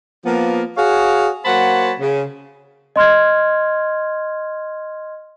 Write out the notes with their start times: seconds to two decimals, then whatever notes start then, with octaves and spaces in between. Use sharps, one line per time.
0.25 F3 A#3 B3
0.77 F#4 G#4 C#5 F5
1.45 F#3 A#3 C5 F#5 A5 B5
2.00 C#3
2.96 D#5 C6 F6 G#6